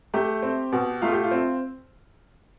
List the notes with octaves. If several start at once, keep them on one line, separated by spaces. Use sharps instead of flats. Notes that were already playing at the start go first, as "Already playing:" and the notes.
A3 G4
C4
B2
A3 F4
G4
F4
C4